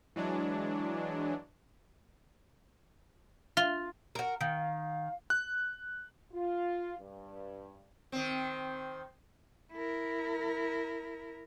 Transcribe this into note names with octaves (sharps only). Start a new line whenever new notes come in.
E3 F#3 G#3 D4
F4
F#4 A#4
D#3 F5
F#6
F4
G2
D#3 C4
E4 A#4